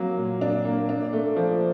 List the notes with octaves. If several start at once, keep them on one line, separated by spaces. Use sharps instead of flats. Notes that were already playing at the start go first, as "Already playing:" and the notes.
Already playing: F#3 A#3
A#2
D4
A#3
D4
A3
F3